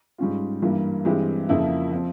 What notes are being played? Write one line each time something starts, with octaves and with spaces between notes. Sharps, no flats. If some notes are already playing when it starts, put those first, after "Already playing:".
G#2 G3 C#4 F4
G2 E3 G3 A#3
G2 E3 G#3 C4 G4
F2 C#3 F3 A#3 E4
F3 C4